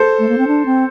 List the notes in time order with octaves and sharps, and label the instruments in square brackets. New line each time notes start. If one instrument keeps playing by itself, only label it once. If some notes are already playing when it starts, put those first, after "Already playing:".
Already playing: [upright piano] A4 C5
[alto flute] A3
A#3
C4
D4
C4